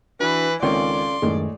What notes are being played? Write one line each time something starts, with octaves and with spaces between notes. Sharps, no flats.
E3 D4 F#4 B4
C#2 D#3 C4 C#4 A4 D5 F5 C6
F#2 A2 D#3 G#3